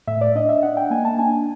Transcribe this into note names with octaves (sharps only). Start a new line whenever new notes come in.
A2 E5
D5
D4 D#5
E5
D4 F#5
G5
A#3 G#5
A5
D4 G#5